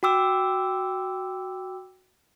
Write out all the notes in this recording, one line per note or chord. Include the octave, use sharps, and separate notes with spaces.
F#4 G5 D6 E6